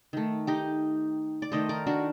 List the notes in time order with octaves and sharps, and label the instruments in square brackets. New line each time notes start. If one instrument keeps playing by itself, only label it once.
[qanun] D#3 A3
D#4 G4
D5
D#3 A3 C5 D#5
A#4 D5
D4 F#4